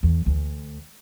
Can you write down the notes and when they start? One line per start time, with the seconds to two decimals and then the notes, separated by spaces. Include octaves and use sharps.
0.03 E2
0.26 D2